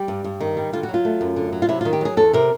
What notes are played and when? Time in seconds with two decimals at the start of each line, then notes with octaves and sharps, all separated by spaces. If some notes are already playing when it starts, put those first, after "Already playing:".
Already playing: G3 G4
0.08 G2
0.24 G2
0.40 D#3
0.57 G3
0.73 D3 F4
0.83 F#4
0.89 F#3
0.94 F4
1.05 A3
1.21 F#2
1.36 D3
1.53 F#3
1.62 F4
1.69 C3 E4
1.81 D#3 F4
1.93 G4
2.01 F#3 G#4
2.17 E2 A4
2.33 C3 A#4